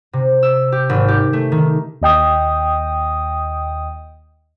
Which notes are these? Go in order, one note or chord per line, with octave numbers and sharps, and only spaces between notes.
C3
E6
G4
G#1
G4
A3
D#3
D#2 D#5 G5 D#6